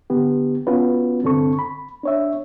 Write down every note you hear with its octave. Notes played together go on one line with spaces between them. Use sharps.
D3 B3 G4
B3 C#4 F4 F#4 B4
C2 G2 D3 C4 A4 C#6
B5
D4 C#5 E5